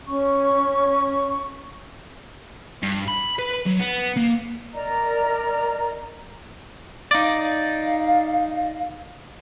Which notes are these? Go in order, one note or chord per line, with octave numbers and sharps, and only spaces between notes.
C#4 C#6
G2
B5
B4
F#3
B3
A#3
A#4 D5 D#5 A#5
D#4 D5 F5